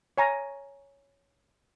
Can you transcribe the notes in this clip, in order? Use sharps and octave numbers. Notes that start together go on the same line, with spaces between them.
C#5 G#5 A#5